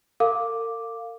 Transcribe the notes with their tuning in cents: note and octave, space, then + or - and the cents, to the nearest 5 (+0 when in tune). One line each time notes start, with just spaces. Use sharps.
A#4 -45 F5 +0 D6 +0